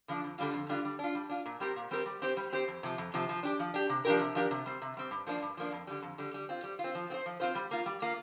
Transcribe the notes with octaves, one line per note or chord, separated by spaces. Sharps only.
D3 F3 D4
F2
D3 G3 D4 F4
F2
D3 G3 D4 F4
G3
D4 F4
G3
D4 F4
A#2
G3 C4 G4 A#4
A#2
G3 C4 G4 A#4
G3
C4 G4 C5
G3
C4 G4 C5
F2
C3 F3
F2
C3 F3
F3
D4 G4
F3
D4 G4
C3
F3 D4 G4 A#4
C3
F3 D4 G4 A#4
C3
G3 C4
C3
G3 C4
G2
F3 A#3 D4
G2
F3 A#3 D4
F2
D3 G3
F2
D3 G3
G3
C4 F4
G3
F4
C4
F3
C4 F4 C5
F3
C4 F4 C5
G3
A#3 F4
G3
A#3 F4